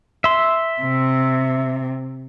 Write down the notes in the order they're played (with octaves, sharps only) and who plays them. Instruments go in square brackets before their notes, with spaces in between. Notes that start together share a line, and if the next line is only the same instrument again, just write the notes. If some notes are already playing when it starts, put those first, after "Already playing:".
[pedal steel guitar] E5 C6
[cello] C3